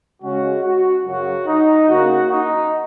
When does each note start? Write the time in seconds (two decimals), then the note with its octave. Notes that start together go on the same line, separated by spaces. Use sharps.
0.22 C#3 G#3 C#4 F#4
0.64 F#4
1.06 F#2 C#3 F#3 C#4 F#4
1.47 D#4
1.89 C#3 A#3 C#4 F#4
2.30 D#4